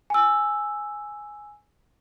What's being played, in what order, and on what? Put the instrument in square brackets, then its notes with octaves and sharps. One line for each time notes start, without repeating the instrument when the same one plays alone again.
[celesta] G#5 E6